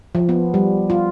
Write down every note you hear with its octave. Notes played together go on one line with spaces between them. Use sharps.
F3
B3
G3
F4